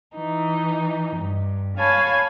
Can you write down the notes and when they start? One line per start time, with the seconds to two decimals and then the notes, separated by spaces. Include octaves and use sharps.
0.15 E3 D#4
1.16 G2
1.77 C#5 F5 G#5 A5 B5